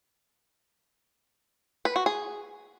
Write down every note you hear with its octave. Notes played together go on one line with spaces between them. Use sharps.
B4
F#4
G#4